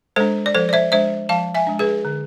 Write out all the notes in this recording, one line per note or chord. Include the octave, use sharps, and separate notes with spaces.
G#3 D4 A4 C5
D5
F3 A4 C5
D5
C5 E5
G#3 D4 C5 E5
F3 F5 A5
E5 G#5
G#3 D4
G#4 B4
D3